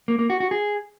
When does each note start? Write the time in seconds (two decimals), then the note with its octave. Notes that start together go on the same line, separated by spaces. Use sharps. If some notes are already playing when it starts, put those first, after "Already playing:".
0.08 A#3
0.19 A#3
0.30 F#4
0.40 F#4
0.51 G#4